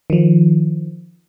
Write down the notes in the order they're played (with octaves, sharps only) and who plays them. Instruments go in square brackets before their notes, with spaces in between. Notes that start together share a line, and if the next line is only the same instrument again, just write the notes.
[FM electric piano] D#3 F3